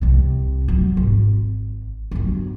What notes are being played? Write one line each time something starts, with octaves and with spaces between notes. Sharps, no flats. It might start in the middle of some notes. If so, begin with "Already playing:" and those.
C2 C3
C3 F#3
G#1
G1 F#3